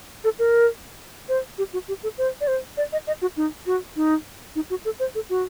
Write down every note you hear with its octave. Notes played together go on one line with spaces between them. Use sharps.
A4
A#4
C5
G4
F#4
G4
A4
C5
D5
C5
D5
D#5
D#5
F#4
D#4
F#4
D#4
D#4
F#4
A4
C5
A4
F#4